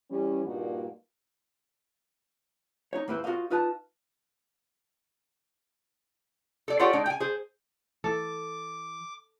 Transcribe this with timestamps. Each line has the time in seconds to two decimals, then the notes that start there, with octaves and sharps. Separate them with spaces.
0.10 E3 G3 C#4
0.45 G2 A#2 A#3 D4 D#4 F#4
2.93 D#4 C#5
3.08 D#2 G#2 A#3 E4 B4 C5
3.24 F4 F#4 A#4 C5 D#5 F5
3.50 D#4 F4 B4 D#5 A5
6.68 A4 D5
6.79 F4 G4 A4 C#5 D5 F#5
6.93 G#3 D4 D#4
7.06 G5 G#5
7.20 G#4 C5
8.04 E3 A4 D6